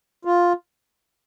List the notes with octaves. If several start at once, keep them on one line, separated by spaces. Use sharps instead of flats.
F4